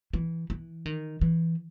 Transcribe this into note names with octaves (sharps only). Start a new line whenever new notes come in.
E3
E3
D#3
E3